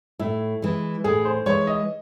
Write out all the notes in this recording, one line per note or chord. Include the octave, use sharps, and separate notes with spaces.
A2 E4
E3 G#3
A2 G#4
C5
E3 G#3 C#5
D#5